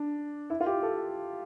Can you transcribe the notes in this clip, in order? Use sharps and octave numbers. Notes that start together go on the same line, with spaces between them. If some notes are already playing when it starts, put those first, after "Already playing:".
Already playing: D4
E4
F4
G4
A4